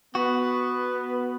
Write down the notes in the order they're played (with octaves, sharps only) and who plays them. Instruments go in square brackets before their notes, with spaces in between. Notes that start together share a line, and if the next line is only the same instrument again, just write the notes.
[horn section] B3 [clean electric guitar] F#4